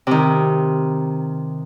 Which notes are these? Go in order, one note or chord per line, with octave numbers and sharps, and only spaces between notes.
C3 D#3